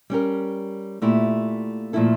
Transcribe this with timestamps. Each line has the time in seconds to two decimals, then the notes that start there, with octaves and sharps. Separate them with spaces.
0.10 G3 C#4 G4 A#4
1.02 A#2 A3 E4 G4
1.93 A#2 F3 A3 E4 A4